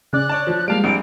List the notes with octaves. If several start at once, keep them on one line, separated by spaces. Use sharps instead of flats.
C#3 C#4 D5 F#6
D4 C#5 D5 A5
F3
G3 G#3 A#3 F5 A5 D7
A#1 C4 D4 D7